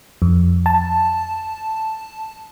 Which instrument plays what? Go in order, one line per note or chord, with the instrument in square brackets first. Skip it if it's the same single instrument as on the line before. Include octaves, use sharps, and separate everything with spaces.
[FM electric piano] F2
A5